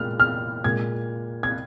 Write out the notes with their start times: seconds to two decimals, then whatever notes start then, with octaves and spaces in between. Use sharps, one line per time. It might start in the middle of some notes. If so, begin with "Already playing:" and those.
Already playing: A#2 G#3 F6
0.20 F6
0.64 A#2 G#3 G#6
1.43 G#6